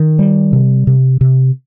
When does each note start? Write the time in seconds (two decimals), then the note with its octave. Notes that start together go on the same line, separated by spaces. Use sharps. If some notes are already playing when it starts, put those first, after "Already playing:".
Already playing: D#3
0.19 G3
0.53 C3
0.87 C3
1.21 C3